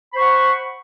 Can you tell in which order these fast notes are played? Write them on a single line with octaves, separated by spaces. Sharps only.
B5 C5 C#6 F#5